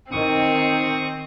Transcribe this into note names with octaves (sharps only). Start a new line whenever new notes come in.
D#3 C4 C#6 D#6